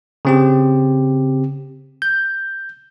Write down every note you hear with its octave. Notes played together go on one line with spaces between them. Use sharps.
C#3 C4 G4
G6